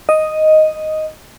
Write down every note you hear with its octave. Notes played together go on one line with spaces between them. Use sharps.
D#5